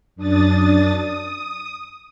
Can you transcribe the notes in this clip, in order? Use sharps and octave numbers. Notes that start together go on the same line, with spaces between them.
F#2 D4 D#6 A6
D#6